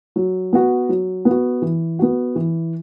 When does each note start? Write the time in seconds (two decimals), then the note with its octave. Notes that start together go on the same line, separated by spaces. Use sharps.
0.16 F#3
0.53 B3 F#4
0.89 F#3
1.25 B3
1.30 F#4
1.62 E3
1.99 B3 F#4
2.35 E3